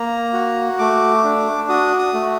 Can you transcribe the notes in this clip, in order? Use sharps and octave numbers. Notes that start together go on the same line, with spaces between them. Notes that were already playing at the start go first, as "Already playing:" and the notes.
Already playing: A#3 A#5
F#4
A3 D6
D4
F#4 D#6
D#6
A3